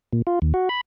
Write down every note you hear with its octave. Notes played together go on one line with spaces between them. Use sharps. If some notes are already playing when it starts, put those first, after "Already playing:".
A#2
F4
D#2
F#4
B5